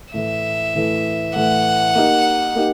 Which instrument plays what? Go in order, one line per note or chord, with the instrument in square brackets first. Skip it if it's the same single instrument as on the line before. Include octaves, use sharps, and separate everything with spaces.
[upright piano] A2 E3 A3 [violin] E5
[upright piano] A2 E3 A3
[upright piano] A2 E3 A3 [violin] F#5
[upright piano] A#3 D#4 G4 A#4
A#3 D#4 G4